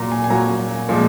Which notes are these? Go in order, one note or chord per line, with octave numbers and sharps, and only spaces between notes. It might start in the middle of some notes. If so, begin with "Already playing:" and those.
Already playing: A#2 F#3 A#5
G#5
G#5
A#2 F#3 A#5
A#2 F3 G#3